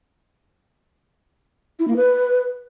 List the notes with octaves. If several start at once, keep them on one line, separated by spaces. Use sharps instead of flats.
E4
A#3
B4